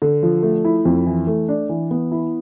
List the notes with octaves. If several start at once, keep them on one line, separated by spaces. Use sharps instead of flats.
D3
F3
A3
E4
F2
E3
A3
D4
E3
B3
E4